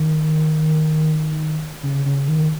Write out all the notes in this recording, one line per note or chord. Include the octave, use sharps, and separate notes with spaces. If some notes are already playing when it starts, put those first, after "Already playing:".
Already playing: D#3
C#3
C#3
D#3